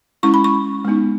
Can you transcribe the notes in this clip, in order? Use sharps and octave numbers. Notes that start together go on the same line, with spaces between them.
G#3 C#4 E4 C#6
B5
C#6
G#3 B3 D#4